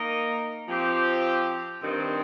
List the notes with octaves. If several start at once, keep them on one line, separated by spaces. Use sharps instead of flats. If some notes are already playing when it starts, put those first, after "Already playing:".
Already playing: A#3 D#4 A#4 D#5
F3 C4 G4
G2 D#3 C4